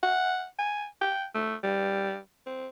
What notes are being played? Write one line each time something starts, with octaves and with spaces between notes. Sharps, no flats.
F#5
G#5
G5
A3
G3
C4